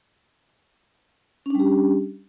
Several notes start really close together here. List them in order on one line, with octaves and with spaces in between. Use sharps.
C#4 D4 G3 G4